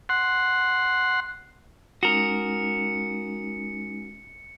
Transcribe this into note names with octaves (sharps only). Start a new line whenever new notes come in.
F#5 C6
G#3 C#4 D#4 F#4 A#4 C#7